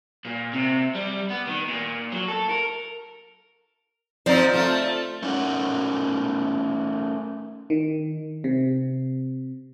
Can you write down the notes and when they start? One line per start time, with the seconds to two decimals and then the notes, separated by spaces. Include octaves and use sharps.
0.25 A#2
0.53 C3
0.95 G3
1.30 B3
1.47 D#3
1.68 A#2
2.12 F#3
2.28 A4
2.49 A#4
4.26 F3 C4 D#4 C5 D5
4.53 A3 F4
5.23 A3 C#4 D#4 A#4 F#5
7.70 D#3
8.44 C3